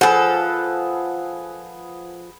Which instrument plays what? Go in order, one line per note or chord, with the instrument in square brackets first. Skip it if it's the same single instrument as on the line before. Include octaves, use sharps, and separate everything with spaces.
[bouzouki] F3 A4 [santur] G#4 B4 [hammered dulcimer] F#5